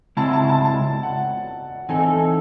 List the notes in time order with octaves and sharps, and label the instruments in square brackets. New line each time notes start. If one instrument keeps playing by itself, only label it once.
[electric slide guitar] C#3 G#3 C4 E4 [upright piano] A5
[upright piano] A5
A5
A5
F#5
[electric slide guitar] E3 C4 D#4 A4 [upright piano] G#5